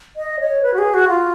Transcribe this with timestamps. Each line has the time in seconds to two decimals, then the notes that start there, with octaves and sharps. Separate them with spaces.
0.16 D#5
0.40 C#5
0.63 B4
0.74 F#4
0.78 G#4
0.94 F#4
1.08 F4